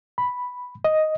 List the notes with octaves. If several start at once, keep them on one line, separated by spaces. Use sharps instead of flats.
B5
D#5